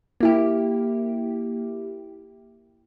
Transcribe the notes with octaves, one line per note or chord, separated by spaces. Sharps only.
A#3 E4 G4